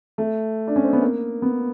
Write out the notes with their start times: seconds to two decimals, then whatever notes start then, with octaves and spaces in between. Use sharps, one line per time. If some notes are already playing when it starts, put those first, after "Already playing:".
0.18 A3
0.68 D4
0.76 C#4
0.84 C4
0.93 B3
1.01 A#3
1.42 B3